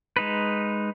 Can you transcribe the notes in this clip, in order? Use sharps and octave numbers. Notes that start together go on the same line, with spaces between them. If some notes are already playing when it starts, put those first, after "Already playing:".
G#3 D#4 B4